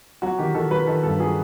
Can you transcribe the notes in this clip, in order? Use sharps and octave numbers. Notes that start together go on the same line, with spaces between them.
F#3 F#4
D#3 G4
D#3 A4
F#3 B4
D#3 A4
G2 A4
F#3 G#4